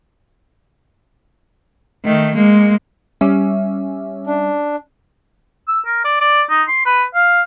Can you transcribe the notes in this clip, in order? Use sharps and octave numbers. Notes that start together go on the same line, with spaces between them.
D#3 A3
G#3 A#3
G3 C#4 E5
D4
E6
A#4
D5
D5
D#4
C6
B4
F5